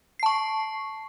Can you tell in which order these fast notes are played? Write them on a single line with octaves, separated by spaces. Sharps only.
C7 A5 C#6